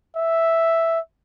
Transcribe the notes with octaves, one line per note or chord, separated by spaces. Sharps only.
E5